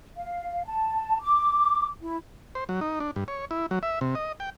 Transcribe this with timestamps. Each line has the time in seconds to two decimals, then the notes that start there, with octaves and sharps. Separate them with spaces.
0.16 F5
0.65 A5
1.21 D6
2.02 E4
2.55 C5
2.69 F#3
2.81 D#4
3.00 D4
3.16 G2
3.28 C#5
3.51 E4
3.71 F#3
3.83 E5
4.01 C3
4.15 D#5
4.40 G5